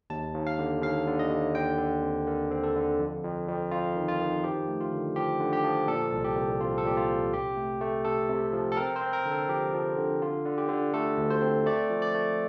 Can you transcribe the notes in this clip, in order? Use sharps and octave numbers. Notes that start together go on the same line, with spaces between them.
D#2 A5
D#2
F5
D3
D#2 F5
D3
D#5
D#2
D3 G5
D3
C4
D3 A#4
C4
A4
D3
F2
F2
F2
F2 F4
D#3
F4
D#3
F3 G4
A3
F4
D3
F3 G4
D3
G4
F3
A#2 A4
C2
G4
C2
C4 F4
A4
A#2 G4
F4
C4
C3 G4
A3
A3
C3 A4
C3
F3
A4
C4 A#4
C5
C4
A#4
D3
A4
F3 G4
F3
D3
D3 F4
D3
G4
D3
A3 A4
D2
C5
C4
A3 D5
F3
D5
A3